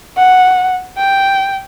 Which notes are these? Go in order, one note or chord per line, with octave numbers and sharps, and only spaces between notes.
F#5
G5